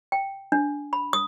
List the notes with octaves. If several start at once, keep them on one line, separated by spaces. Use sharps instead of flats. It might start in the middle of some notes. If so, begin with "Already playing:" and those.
G5
D4
B5
D#6